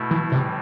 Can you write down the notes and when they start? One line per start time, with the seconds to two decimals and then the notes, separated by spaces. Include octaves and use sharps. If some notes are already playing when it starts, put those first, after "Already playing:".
Already playing: B2 A3 E4
0.11 E3
0.31 A2 C3 E3 G3